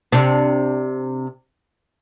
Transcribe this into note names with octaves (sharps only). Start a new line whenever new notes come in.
C3 D4